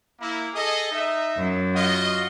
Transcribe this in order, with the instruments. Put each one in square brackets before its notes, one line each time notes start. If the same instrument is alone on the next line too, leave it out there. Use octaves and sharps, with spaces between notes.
[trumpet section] A#3 E4
G#4 A4 D#5
D#4 E5
[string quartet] F#2
[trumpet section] F4 F#4 D#5